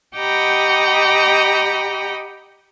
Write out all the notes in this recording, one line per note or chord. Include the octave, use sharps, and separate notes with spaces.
G4 D#5 F#5 G5 A#5 B5